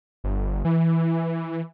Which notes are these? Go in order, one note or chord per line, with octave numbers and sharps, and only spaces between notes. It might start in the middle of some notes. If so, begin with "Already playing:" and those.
G1
E3